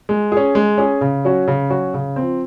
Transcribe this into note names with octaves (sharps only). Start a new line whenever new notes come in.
G#3
C#4 G#4
G#3
C#4 G#4
C#3
F#3 C#4 F#4
C#3
F#3 C#4 F#4
C#3
C4
F3